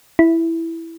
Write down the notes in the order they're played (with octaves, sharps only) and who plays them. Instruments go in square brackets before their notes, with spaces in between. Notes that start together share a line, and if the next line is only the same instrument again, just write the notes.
[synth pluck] E4